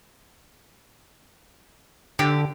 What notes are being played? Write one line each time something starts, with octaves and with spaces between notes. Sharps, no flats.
D3 G4